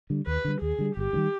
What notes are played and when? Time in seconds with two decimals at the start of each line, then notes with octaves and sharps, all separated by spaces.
0.10 D3 G3
0.27 D#2 B4
0.45 D3 G3
0.61 D#2 G#4
0.79 D3 G3
0.97 G1 G4
1.13 G2
1.16 D#3 G3